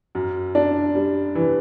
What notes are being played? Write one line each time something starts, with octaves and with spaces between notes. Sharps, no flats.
F#2
D4
G3
E3